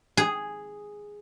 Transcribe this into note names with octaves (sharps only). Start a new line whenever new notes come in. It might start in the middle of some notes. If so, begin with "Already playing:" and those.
G#4